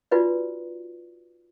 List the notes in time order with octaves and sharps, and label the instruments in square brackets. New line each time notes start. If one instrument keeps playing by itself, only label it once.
[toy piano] D#4 F4 F#4 B4 D5